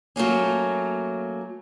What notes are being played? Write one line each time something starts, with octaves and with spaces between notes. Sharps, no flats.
F#3 A3 A#3 C#4